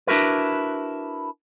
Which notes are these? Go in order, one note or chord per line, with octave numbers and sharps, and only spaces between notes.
D4 E4 F#4 A#4 B4